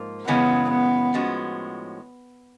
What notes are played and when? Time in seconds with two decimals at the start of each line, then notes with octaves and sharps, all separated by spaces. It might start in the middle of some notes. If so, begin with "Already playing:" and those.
Already playing: G#2 F3 A#3
0.27 F#2 C#3 E3 G#3 B3 C#4
0.71 B3
1.14 A2 F3 G#3 C#4 F#4